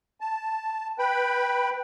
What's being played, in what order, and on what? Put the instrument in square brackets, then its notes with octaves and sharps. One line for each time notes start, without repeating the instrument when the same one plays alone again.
[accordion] A5
B4 G5 B5